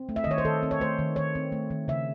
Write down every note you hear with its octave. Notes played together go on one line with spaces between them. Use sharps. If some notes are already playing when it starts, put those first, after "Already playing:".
Already playing: C4
A3
E5
D#5
D#3 C#5
C5
D#3 A4
C4
C#5
A3 C5
D#3
D#3 C#5
C4
A3
D#3
C#3 E5